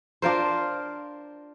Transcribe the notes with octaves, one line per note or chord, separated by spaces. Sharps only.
D4 F4 A#4 C5